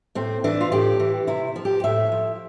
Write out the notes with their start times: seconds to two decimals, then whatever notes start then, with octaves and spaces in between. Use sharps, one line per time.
0.15 A2 C4
0.44 E3 D4
0.61 F4
0.72 A2 G4
1.00 E3
1.27 C3 E4
1.56 F3
1.65 G4
1.84 A2 E5
2.12 F3